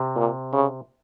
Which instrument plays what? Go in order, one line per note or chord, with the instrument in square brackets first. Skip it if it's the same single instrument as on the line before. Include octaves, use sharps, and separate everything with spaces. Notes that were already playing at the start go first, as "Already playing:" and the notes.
Already playing: [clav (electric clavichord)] C3
[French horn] A#2
C#3